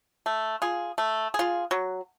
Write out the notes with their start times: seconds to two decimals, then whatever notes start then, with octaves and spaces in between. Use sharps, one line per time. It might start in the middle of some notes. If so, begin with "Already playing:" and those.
0.26 A3
0.62 F4 G#4
0.98 A3
1.34 G#4
1.39 F4
1.71 F#3